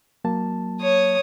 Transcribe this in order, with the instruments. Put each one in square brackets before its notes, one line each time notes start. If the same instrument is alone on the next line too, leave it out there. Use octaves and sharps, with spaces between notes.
[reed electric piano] F#3 A#3 A5
[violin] C#5 D#6